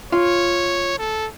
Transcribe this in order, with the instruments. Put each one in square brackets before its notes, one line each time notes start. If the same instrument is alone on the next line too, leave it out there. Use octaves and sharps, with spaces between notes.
[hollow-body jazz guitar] F4 [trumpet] C#5
[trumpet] A4